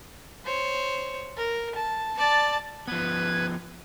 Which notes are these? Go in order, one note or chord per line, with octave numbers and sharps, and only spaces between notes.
C5 C#5
A#4
A5
D5 A5
F3 B3 B4 G#6